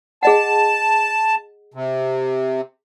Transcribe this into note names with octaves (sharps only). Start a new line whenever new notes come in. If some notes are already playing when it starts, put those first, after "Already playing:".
G#4 D#5 F#5 A5
C3